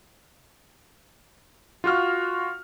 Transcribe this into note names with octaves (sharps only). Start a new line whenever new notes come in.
F4 F#4 F6